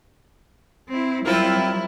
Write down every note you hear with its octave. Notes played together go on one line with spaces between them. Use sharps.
C4 E4
F#3 G3 C4 E4 F4 A#4